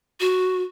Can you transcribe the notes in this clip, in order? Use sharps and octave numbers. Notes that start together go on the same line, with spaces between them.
F#4